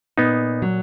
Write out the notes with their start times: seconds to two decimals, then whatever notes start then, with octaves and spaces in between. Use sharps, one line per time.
0.18 A#2 B3 D#4
0.62 F#3